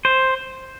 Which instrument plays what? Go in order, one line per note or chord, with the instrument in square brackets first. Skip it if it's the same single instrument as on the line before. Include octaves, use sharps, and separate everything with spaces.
[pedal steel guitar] C5